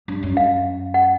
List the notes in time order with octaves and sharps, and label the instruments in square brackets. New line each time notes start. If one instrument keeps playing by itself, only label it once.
[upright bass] G2
F#2
[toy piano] F5
F#5